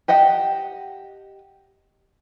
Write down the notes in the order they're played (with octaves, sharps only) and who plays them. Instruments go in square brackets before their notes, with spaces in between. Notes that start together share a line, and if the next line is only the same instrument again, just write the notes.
[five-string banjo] G4 D#5 F#5 G5 A5